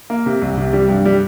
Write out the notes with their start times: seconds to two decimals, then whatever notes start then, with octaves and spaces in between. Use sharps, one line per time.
0.10 A#3
0.26 C3
0.42 C2
0.57 C3
0.73 G3
0.89 G2
1.06 G3